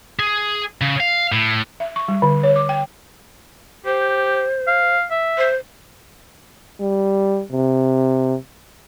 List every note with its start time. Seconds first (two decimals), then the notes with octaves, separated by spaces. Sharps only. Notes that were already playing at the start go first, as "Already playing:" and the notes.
0.19 G#4
0.81 C#3
1.00 F5
1.32 A2
1.80 E5
1.96 C#6
2.08 G3
2.22 D3
2.43 C#5
2.56 D6
2.69 G5
3.85 G4 C5
4.67 F5
5.11 E5
5.38 C5
6.80 G3
7.52 C3